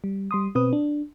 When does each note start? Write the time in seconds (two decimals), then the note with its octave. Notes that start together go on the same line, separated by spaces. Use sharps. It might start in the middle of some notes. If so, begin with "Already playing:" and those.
0.04 G3
0.31 G3 C6 D#6
0.55 B2 C4 B4 D#6
0.73 D4